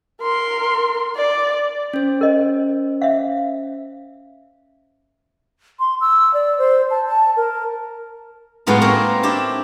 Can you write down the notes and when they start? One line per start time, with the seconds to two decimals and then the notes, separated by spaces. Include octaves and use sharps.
0.22 A#4 C6
1.16 D5
1.94 C#4 C5
2.21 A#4 D#5
3.02 E5 F5
5.79 C6
6.01 E6
6.34 D5
6.59 C5
6.91 A5
7.06 A5
7.37 A#4
8.67 A2 F#3 G#3 B3 D#4 F4
8.81 A#3 C4 A#4 C#5
9.23 D4 E4 G4 E5 A5